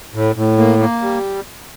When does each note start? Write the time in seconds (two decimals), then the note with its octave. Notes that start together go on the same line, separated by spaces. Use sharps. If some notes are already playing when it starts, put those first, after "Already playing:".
0.14 A2
0.36 A2
0.58 A#3
0.79 A#3
1.01 G3